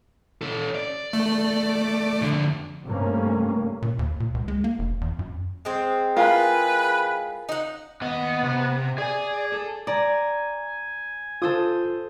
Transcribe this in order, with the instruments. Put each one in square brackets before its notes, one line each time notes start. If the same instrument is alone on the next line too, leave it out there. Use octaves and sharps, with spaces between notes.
[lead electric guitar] C#4 A4
D5
[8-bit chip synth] A3
[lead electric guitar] F2 D3
[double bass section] G2 C3 A3 A#3 C#4
[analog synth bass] A#2
D#2
A#2
C#2
G#3
A#3
F1
E2
F#2
[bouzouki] G#3 C4
[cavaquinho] E4 F4 [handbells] A#4 F5 G#5 [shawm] B4
[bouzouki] D#4 F#5
[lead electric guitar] D#2 D#5 [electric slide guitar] B3
[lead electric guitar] C3
[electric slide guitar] G#4 G#5 [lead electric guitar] D5
[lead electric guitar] A4
[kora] D5 [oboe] G#5 [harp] A#5
[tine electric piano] F4 [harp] A4 C5 D#6